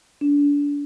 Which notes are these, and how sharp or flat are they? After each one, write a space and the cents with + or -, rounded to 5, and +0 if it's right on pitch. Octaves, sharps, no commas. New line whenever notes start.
D4 -30